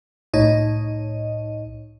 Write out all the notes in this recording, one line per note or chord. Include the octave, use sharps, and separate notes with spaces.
C2 A2 D#4 C#5 D#5